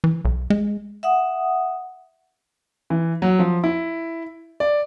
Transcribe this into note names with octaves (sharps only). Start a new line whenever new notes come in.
E3
B1
G#3
E5 F#5 D#6
E3
F#3
F3
E4
D5